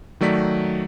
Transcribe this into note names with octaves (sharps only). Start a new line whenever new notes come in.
D#3 F#3 A3 D5 B6